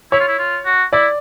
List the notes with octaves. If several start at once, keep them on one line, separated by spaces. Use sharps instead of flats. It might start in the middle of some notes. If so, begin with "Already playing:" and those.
E4 C#5
F4
E4
F4
F#4
E4 D5